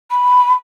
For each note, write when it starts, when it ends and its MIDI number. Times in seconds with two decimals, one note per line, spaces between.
0.11 0.53 83